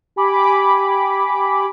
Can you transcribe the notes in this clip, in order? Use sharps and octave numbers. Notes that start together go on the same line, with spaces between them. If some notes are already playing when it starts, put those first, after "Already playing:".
G4 G#5 B5 D6